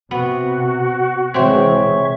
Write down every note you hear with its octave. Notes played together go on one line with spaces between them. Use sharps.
C3 B3 F#4
C3 E3 G#3 C4 C5 C#5 E5 C#6